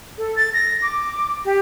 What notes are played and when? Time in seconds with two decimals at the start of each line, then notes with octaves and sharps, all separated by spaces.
0.18 A4
0.36 A6
0.54 A#6
0.82 D6
1.45 G4